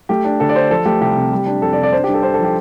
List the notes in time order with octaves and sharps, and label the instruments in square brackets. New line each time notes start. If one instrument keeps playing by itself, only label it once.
[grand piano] A3 G4
D4
D2 A4
D5
D3 C5
F3 A4
A3 G4
C2 G4
C3
G3
D4
F2 A4
D5
C3
D5
D4 C5
G4
G2
A4
G2 C5
A4
F3 G4